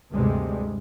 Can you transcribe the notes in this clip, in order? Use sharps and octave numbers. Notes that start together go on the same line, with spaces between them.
D2 G2 C3 G3 G#3